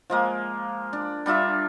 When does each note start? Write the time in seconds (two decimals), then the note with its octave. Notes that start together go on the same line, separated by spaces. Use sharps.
0.10 F3 G#3 A#3
0.93 D4
1.26 G3 D4 F4 E5